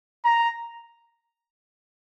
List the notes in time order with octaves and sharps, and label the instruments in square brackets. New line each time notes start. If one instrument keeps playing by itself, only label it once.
[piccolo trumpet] A#5